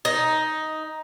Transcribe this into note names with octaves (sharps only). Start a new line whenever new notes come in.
D#4